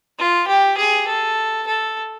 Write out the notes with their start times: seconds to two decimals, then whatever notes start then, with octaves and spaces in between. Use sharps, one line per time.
0.18 F4
0.47 G4
0.78 G#4
1.07 A4
1.67 A4